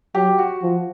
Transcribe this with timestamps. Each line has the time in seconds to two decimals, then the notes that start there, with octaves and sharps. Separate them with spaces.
0.15 F#3 G4
0.38 F#4
0.62 F3